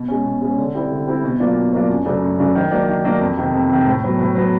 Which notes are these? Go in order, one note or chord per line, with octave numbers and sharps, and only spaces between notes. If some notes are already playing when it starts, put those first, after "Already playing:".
Already playing: B2
G#3 C#4
B2
G#3 C#4
D3
G3 C4 E4
D3
G3 C4 E4
B2
F#3 A#3 D4 F4
B2
F#3 A#3 D4 F4
F#2
C#3 F#3 A3 D4
F#2
C#3 F#3 A3 D4
D#3
F#3 A#3 D4
D#3
F#3 A#3 D4
F2
C3 D#3
F2
C3 D#3
A2
F#3 B3
A2
F#3 B3